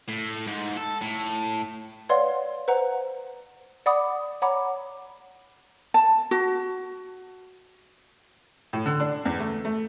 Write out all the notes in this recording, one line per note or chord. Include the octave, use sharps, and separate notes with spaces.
A2
G#2
A4
A2
B4 C#5 D5 F5 F#5 C6
B4 C5 F#5 A#5
D5 F#5 B5 D6 D#6
C#5 F#5 A#5 B5 D6
A5
F#4
A2
D3
D4
E2
A3
A3